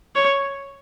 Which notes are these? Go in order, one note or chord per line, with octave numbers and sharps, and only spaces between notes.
C#5